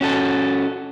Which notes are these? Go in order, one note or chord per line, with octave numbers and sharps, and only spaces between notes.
C#4 F#4 A4